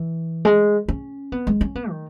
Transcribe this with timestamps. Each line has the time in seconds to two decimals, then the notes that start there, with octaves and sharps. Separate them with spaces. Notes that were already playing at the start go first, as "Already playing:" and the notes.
Already playing: E3
0.45 G#3
0.88 C#4
1.32 B3
1.47 G#3
1.61 C#4
1.75 B3
1.90 D#3